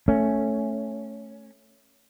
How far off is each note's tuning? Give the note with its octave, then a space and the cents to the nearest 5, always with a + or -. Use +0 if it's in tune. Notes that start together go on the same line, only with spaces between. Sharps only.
A3 +0 C#4 +0